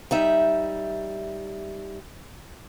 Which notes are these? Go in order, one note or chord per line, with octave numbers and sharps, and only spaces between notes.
G3 D#4 E5